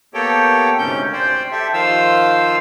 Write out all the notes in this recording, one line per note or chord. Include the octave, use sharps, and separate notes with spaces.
A#3 B3 G4 A4 C#5 G5
D2 G#2 C3 C#4 G6
C5 D5 G5
G4 A4 E5
D#3 F3 F4 C5 F5 E6